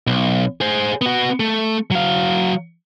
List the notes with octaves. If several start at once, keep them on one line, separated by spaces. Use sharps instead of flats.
B1
G#4 C5
B3 F#4
A3
F#3 F5